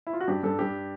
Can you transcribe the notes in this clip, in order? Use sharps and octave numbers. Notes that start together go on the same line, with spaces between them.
E4
F4
F#4
G2 G4
G2 A4
G2 G4